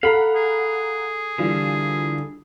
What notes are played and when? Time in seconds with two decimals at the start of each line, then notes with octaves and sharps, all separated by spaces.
0.03 A4 F5 F#5 A#5 B5
0.35 G#4
1.38 D3 E3 G3 F4